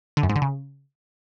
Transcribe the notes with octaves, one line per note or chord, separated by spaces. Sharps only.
D3
F#2
G#2
D3
C#3